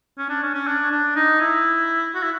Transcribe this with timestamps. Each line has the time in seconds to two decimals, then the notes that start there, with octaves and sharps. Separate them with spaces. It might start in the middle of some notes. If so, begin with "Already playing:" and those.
0.18 C#4
0.29 D4
0.43 C#4
0.54 C#4
0.67 D4
0.91 D4
1.15 D#4
1.41 E4
2.15 F#4
2.23 E4